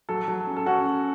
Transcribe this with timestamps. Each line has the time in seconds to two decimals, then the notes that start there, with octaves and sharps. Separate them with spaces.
0.09 F#3 A4
0.28 F#3
0.47 C#4
0.57 A4
0.66 C#4 F#4
0.86 C#4